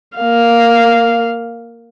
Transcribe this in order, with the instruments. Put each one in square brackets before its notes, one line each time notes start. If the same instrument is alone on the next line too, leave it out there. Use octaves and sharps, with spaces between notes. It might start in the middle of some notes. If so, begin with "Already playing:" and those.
[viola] A#3 F5